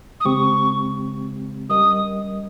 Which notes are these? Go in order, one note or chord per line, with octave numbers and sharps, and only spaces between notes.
D#6
C#3 G#3 C4 G4 C#6
G3 C#4 G4 A#4 D#5 D#6